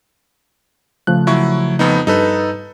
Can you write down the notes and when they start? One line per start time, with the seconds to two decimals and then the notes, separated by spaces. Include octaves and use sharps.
1.07 C#3 F3 A3 F#6
1.27 F#3 E4 C#6
1.79 F2 B3 D#4
2.07 G2 D#4 A4 B4